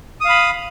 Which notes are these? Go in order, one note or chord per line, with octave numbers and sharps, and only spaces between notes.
F5 B5 D#6